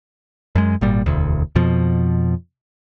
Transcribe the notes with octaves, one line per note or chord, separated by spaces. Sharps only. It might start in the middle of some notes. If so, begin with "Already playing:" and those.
F#2 G#3
G#1 A#2 G3
E1 D2
F2 B2 F3